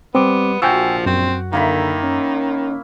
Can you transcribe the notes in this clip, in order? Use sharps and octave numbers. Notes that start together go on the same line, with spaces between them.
G3 B3 C4 C6 D6
A#1 F3 F#4 G5 G#5 E6
F#2 C4
D3 D#3 A#3 E4 B5
C#4